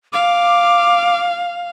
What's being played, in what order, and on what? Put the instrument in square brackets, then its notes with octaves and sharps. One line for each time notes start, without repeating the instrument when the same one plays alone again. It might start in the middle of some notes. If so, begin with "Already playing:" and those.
[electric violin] F5 [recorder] D6